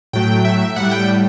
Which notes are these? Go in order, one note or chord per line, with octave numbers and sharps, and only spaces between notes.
A2 F#3 A3 G5
E5
A2 G3 F#5
G5